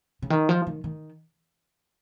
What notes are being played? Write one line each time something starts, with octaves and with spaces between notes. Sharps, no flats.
C#3
D#3
F3
D#3
D#3